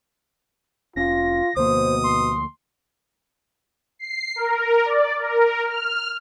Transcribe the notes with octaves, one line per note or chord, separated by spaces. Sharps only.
F1 C#4 F4 A#6
D2 B2 F3 A#3 C5 D#6
C6
C7
A#4
D5
A#4
F6